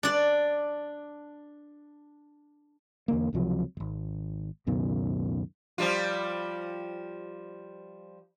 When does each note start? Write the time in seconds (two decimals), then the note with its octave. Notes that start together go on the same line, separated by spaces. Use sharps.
0.03 D4 D5
3.08 E2 D3 A#3
3.33 C#2 C3 F3 F#3
3.77 D1 G#1
4.67 C#2 F#2 B2 D#3
5.78 F3 G3 F4